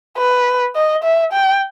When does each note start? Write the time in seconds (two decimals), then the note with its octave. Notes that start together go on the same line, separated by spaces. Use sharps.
0.18 B4
0.76 D#5
1.04 E5
1.33 G5